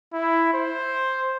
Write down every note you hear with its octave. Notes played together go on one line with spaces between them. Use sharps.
E4
C5